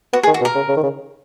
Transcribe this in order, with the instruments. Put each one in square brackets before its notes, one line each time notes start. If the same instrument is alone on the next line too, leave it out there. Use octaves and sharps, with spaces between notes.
[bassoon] B3 [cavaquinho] F#4
[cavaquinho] G#4
[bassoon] D#3
[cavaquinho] F#4
[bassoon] B2
[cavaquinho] A#4
[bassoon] C#3
C#3
D#3
C#3